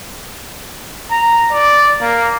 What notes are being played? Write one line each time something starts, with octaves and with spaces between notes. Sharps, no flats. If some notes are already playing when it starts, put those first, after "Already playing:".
A#5
D5
A#3